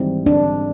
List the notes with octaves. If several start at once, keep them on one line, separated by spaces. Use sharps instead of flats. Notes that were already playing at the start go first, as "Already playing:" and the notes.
Already playing: G#1 G#2 E3 G3 C4
D4